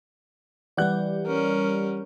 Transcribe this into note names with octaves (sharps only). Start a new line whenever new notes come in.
E3 G3 G4 D5 F#5 F#6
C#4 A#4